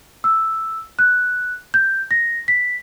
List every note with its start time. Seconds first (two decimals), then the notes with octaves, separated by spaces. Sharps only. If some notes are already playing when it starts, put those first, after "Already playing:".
0.24 E6
0.99 F#6
1.74 G6
2.11 A#6
2.48 B6